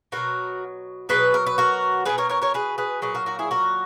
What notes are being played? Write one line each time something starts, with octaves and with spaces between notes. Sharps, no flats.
B2 F#3 F#4 A#4
B2 F#3 G#4 B4
A#4
B4
F#4 A#4
B2 G#3 G#4 B4
A#4 C#5
A#4 C#5
A#4 C#5
G#4 B4
G#4 B4
A#2 F#3 G#4 B4
F#4 A#4
F#4 A#4
E4 G#4
F#4 A#4